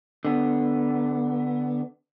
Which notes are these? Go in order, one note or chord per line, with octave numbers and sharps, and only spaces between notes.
D3 B3